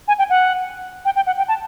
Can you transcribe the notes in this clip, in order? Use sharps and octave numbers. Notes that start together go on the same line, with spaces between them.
G#5
G5
F#5
G5
G5
F#5
G5
A5